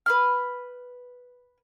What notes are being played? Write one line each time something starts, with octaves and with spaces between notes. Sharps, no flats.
B4 B5 F6